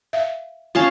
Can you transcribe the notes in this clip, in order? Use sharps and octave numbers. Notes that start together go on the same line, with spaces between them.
E5 F5
C#4 F4 F5 A5